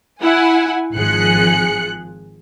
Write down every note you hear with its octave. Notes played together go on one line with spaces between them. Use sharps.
E4 F#5 G#5
G#1 F3 G#4 F#6 C#7